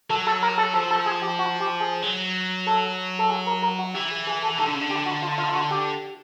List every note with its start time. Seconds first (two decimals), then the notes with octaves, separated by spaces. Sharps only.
0.10 F#3 A4
0.27 A4
0.43 A#4
0.58 A4
0.74 F3 A4
0.91 A4
1.06 G#4
1.22 G4
1.39 F#4
1.60 G4
1.80 G#4
2.02 F#3
2.67 A4
3.19 A4
3.30 G#4
3.47 A#4
3.62 A#4
3.79 F#4
3.94 E3 G4
4.11 G#4
4.27 G#4
4.42 A4
4.58 D#3 A4
4.66 D3
4.74 C#3
4.81 D3
4.90 G4
5.06 F#4
5.22 F4
5.38 F4
5.49 F4
5.55 F#4
5.71 G4